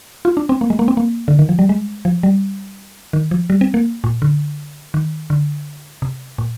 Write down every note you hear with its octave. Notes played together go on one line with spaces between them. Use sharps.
F4
D4
C4
A#3
G#3
A#3
C4
A#3
D3
D#3
F3
G3
G#3
F3
G3
D#3
F3
G3
C4
A#3
A#2
D3
D#3
D3
C3
A#2